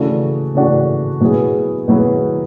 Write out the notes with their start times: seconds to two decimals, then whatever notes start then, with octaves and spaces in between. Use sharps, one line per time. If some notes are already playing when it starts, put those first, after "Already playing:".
Already playing: C#3 E3 A3 D4 F#4
0.55 C#3 E3 A3 D4 F#4
1.20 B2 F#3 B3 E4 G#4
1.88 B2 F#3 B3 E4 G#4